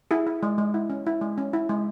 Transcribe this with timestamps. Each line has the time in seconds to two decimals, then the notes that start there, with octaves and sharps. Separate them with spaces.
0.11 E4 G#4
0.27 E4
0.43 G#3
0.58 G#3
0.74 E4
0.90 C#4
1.07 E4
1.21 G#3
1.38 C#4
1.53 E4
1.69 G#3